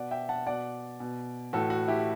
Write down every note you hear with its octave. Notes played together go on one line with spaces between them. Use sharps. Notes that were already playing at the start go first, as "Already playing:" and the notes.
Already playing: B2 D5 F#5
E5 G5
F#5 A5
B2 D5 F#5
B2
A2 E3 F#4 A4
F#4
E4 G4